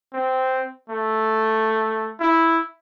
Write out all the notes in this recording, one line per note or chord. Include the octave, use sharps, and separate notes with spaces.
C4
A3
E4